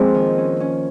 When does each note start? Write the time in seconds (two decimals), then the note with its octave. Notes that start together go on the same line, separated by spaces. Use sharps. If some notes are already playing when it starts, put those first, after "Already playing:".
Already playing: F3 G#3 A#3 C4
0.14 D#3
0.38 C#4
0.60 C#4